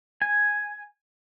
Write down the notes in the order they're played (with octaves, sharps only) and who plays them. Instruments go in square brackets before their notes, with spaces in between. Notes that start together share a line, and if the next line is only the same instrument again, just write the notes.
[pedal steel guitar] G#5